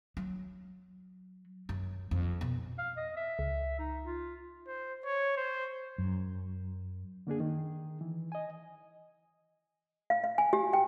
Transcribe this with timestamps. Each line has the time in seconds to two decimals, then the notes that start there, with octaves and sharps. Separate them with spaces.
0.17 F#3
1.69 F#2
2.11 F2
2.41 B2
2.78 F5
2.97 D#5
3.17 E5
3.39 C#2
3.79 D#4
4.04 F4
4.68 C5
5.05 C#5
5.37 C5
5.98 F#2
7.27 D3 A#3 D4 G#4
7.40 D#3
8.01 E3
8.32 D#5 G#5
10.10 F5
10.24 F5
10.38 G#5
10.53 G4
10.73 G5